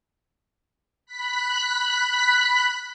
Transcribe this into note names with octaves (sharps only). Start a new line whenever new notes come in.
B5 F#6 B6